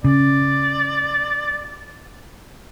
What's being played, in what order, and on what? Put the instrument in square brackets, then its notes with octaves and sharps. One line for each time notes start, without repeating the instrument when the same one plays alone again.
[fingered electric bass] C#3 [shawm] D5